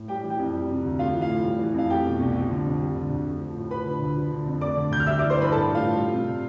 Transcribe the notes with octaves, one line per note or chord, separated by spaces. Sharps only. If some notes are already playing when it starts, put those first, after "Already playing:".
Already playing: A2
G3 G4 G5
E3
G4 G5
F2
G3
C3
D2
A3 F4 F5
E3
F4 F5
A2
G3
E3
F2 F5
A3 G4 G5
B2
C2
F3
D3
F2
G3
D3
D2
A3
F3
A2
F3 B4 B5
D3
D2
F3
D3
F2
A3 D5 D6
D3
D2 G6
F6
G3 E5 E6
D5 D6
E3
C5 C6
G2 B4 B5
A2 A4 A5
G3
F4 F5
A2
G3
C3